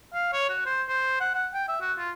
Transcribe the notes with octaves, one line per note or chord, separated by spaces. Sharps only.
F5
C#5
F#4
C5
C5
F#5
F#5
G5
E5
F#4
F4